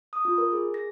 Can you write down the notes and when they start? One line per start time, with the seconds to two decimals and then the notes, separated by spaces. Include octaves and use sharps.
0.13 D#6
0.25 F4
0.38 A#4
0.52 G#4
0.74 A#6